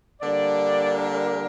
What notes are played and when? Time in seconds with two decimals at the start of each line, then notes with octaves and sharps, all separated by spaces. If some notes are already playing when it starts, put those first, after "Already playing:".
0.21 D3 G3 A#3 D4 D5
0.94 A#4